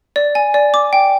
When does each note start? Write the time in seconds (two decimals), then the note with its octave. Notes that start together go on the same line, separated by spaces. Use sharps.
0.16 D5
0.35 G#5
0.54 D5
0.74 D6
0.93 G5